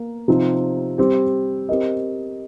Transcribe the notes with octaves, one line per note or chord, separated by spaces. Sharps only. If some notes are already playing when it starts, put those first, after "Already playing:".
Already playing: A#3 A#4
C3 F3 C4 D#4
G3 C4 G4
C4 G4 A#4 D#5